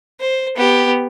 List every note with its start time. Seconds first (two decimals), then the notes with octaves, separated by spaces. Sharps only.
0.20 C5
0.56 B3 G4